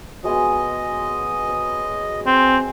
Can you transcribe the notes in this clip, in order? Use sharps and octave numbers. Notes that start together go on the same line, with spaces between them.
F#3 G#3 B3 D#5
C#5 B5
C4 G#5